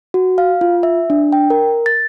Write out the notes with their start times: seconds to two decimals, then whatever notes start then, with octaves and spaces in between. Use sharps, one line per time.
0.14 F#4
0.38 F5
0.61 F4
0.83 E5
1.10 D4
1.33 G5
1.50 A#4
1.86 A6